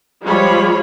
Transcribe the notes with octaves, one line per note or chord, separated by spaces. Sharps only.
F3 G3 G#3 F4 C#5 B5